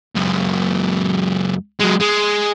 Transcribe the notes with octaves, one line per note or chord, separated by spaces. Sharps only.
C#2 F#2
F#3 G#3
G#3